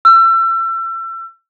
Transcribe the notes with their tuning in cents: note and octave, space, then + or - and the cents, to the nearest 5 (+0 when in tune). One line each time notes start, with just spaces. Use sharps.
E6 +35